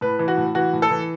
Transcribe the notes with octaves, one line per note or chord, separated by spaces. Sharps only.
A2 B4
E3
F#4
A2
E3 F#4
A2
A4
E3